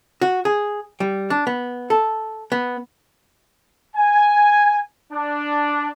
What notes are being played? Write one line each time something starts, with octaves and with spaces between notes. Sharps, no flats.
F#4
G#4
G3
D4
B3
A4
B3
G#5
D4